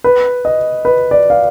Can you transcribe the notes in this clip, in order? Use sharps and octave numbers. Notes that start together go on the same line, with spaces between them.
B4
D#5
B4
D5
F5